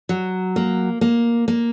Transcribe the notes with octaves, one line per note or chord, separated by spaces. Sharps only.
F#3
A#3
A#3
A#3